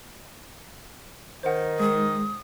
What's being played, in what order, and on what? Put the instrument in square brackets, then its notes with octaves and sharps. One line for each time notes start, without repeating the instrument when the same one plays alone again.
[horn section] D#3 [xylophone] C5 F#5
[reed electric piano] G#3 [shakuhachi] D#6